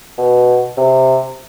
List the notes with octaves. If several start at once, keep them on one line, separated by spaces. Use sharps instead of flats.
B2
C3